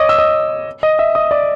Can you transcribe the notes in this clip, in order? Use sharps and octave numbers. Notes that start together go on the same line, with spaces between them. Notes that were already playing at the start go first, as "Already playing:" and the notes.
Already playing: C#5 D#5 D6 D#6
E6
D#5 D#6
D#5 D#6
E5 E6
D#5 D#6
D5 D6